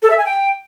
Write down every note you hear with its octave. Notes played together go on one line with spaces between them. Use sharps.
A4
E5
G#5
G5